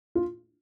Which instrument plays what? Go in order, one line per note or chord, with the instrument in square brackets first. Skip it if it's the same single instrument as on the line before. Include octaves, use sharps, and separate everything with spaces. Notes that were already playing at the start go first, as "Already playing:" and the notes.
[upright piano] F4